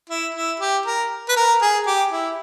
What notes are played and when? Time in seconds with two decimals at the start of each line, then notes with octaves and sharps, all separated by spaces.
0.10 E4
0.34 E4
0.60 G4
0.86 A#4
1.29 B4
1.36 A#4
1.61 G#4
1.86 G4
2.12 E4